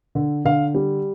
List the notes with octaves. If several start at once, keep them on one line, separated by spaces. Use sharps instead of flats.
D3
D3 F5
G3